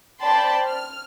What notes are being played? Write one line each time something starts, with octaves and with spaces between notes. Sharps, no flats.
C5 D5 G5 A5 B5 C6
F6